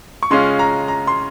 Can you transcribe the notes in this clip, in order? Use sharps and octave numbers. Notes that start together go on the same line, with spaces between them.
C#6
C#3 G#3 C#4 F4 C6
A#5
A#5
C6